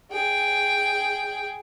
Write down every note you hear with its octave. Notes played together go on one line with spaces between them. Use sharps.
G#4 G5